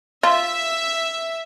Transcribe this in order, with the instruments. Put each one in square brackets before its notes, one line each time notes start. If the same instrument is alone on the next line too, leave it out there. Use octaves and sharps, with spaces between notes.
[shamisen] F4 [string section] E5